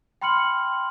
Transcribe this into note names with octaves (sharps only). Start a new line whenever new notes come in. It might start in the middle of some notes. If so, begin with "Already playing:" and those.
G5 B5 C6 F6 C#7 F#7